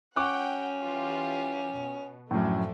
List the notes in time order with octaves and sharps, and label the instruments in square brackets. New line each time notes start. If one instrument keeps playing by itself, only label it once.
[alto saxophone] C#4 [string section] F#5 G5 [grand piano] C#6 D6 F#6
[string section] E3 F4 G4
B2
[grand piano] F#2 A2 [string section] F3 A3 D4